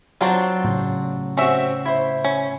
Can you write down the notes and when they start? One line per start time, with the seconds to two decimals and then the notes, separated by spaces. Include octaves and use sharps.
0.21 F#3 C4 D4 F4
0.64 A2 C#3
1.37 C4 C#4 F#4 E5
1.86 E4 C5
2.24 C#4